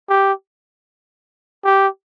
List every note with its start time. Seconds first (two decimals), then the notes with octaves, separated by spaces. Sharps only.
0.09 G4
1.64 G4